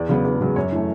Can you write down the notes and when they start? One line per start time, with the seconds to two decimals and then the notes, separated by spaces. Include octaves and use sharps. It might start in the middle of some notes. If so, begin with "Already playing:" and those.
Already playing: E2 D5
0.09 C#3 F#3 B3
0.25 E2
0.40 C#3 F#3 B3
0.56 F#2 C#5
0.72 E3 A3